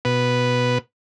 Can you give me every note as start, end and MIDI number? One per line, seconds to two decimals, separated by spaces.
0.05 0.78 47
0.05 0.78 71